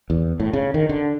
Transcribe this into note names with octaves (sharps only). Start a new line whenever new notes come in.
E2
A2
C#3
D#3
D3